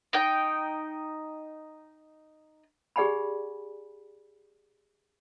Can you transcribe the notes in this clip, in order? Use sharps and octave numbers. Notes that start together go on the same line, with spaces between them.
D#4 D#5 G5
G4 G#4 D5 F#5 G#5 B5